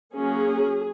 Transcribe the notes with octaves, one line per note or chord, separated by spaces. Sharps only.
F#3 A#3 C#4 G#4